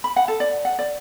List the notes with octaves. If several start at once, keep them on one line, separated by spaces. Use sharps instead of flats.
B5
F#5
A4
D5
F#5
D5